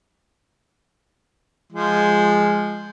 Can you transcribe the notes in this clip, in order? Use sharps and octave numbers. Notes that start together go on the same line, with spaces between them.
F3 G#3